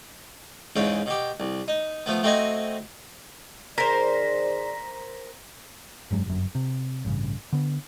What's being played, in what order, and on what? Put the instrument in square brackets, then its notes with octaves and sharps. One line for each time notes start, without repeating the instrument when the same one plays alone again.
[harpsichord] E2 G#2 C#3 C#4
B2 G4
C2
D#4
F3 A3 B3
A3 C4 F#4 D#5 G#5
[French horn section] D#3 G#4 D5 [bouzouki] A#4 C5 [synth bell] A#5 A#6 B6
[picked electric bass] F1 G2 F#3 G#3
G1 F#2
C3
A1 G2 C#3
D3 B3